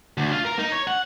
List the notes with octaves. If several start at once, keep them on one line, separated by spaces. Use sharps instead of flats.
D2
F4
A#4
D#4
C#5
F#5